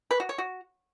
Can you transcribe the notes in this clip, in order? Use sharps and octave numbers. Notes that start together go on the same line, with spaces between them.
B4
F#4
C#5
F#4